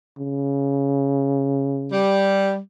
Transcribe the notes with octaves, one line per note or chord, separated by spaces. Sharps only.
C#3
G3